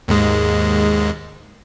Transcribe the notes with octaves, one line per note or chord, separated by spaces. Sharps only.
D#2 G#2 G#3